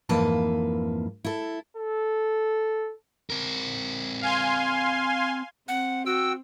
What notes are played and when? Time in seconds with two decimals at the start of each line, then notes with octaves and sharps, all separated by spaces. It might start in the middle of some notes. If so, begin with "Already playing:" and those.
0.09 F2 G#2 E3 A#3 B4 A5
1.24 E4 A4
1.77 A4
3.30 C4 A#4
4.21 F5 G#5 C6
5.68 C4 F#5
6.06 F#4 G5 E6